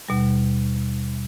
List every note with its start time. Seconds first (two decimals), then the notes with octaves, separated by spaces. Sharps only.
0.09 D#2 B2 G3